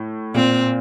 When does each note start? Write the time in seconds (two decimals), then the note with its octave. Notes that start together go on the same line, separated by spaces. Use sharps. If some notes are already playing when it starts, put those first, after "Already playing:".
Already playing: A2
0.34 A#2 C4